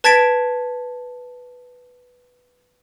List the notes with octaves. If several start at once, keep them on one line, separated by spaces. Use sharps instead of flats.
B4 A5 G#6 A6 B6 D7